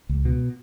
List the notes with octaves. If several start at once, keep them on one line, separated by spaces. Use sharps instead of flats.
C#2
B2